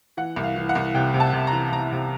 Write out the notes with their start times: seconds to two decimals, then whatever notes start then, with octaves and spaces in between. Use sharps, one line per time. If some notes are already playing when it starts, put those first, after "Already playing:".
0.17 E3 F#5
0.36 C2
0.44 F5
0.56 E3
0.69 F#5
0.75 C2
0.94 C3 G5
1.14 C3
1.20 A5
1.33 C3
1.47 A#5
1.52 E3
1.72 C3 A#5
1.92 C3